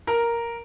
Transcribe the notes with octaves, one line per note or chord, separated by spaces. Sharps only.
A#4